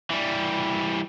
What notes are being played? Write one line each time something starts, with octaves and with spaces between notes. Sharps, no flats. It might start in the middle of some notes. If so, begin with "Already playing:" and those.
E3 G3